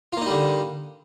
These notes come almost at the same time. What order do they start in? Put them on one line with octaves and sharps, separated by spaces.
F4 A#3 D#4 G3 D3